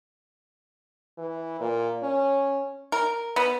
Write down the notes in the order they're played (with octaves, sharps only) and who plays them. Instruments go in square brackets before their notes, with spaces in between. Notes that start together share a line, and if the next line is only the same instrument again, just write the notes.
[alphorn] E3
A#2
C#4
[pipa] A#4
B3